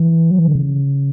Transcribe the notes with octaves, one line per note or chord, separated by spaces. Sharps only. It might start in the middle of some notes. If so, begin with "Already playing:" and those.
Already playing: E3
F#3
E3
D3
C#3